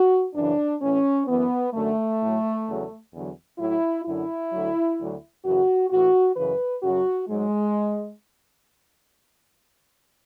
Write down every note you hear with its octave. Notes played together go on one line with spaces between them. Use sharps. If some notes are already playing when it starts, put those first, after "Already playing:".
Already playing: F#4
F#2 C#3 E3 D4
A2 E3 C#4
F#2 E3 B3
F#2 D3 F#3 A3
A2
F#3
E2 C#3 F#3
E2 D3 F#3
A2 F#3 E4
F#2 D3 F#3 E4
D2 D3 F#3
D2 D3 F#3
F#2 C#3 E3 F#4
A2 E3 F#4
F#2 C#3 E3 B4
F#2 C#3 F#3 F#4
G#2 F#3 G#3